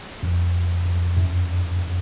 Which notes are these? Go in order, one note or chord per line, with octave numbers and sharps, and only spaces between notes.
F2
F2
F#2